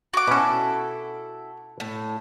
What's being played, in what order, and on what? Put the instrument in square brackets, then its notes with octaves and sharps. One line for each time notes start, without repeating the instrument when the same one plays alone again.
[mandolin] F#4 D6
[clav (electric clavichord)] B2 C#4 [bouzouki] E4 A4
[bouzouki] A2